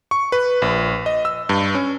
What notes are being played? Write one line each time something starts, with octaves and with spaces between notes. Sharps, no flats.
C#6
B4
A#1
D#5
E6
G2
C#4